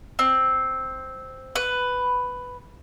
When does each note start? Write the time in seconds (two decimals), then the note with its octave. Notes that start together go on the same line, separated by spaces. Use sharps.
0.19 C4
1.56 B4